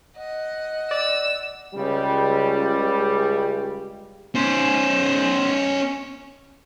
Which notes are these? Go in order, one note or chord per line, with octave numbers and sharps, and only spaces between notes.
D#5 F#5
D5 E6
C#2 G3
C#4 C5